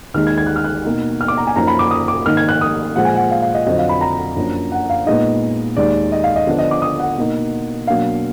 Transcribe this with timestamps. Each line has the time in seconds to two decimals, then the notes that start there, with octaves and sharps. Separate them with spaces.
0.14 D#2 D#3 G#3 D#4 F6
0.27 G#6
0.38 G#6
0.47 F#6
0.56 F6
0.64 F#6
0.85 B2 A#3 D#4
1.21 F6
1.28 D6
1.37 A#5
1.47 G#5
1.56 F#2 F3 A#3 D#4 A#5
1.67 B5
1.79 D6
1.91 D#6
2.08 D6
2.25 G#2 D#3 A#3 D#4 F6
2.37 G#6
2.49 F#6
2.61 D#6
2.96 A#2 F3 G#3 F#5
3.05 G#5
3.15 F#5
3.31 F5
3.42 F5
3.54 D#5
3.66 F2 D3 F#3 D#5
3.78 F5
3.89 B5
4.01 A#5
4.37 F#2 F3 A#3 D4
4.72 F#5
4.90 F5
5.06 A#2 G#3 B3 D#4 D#5
5.77 D#2 D#3 G#3 D5
6.12 D#5
6.24 F5
6.36 D#5
6.47 D3 F3 B3 D4
6.58 D#5
6.71 D6
6.82 D#6
7.00 F#5
7.18 B2 A#3 D#4
7.87 B2 F#3 A#3 D4 F5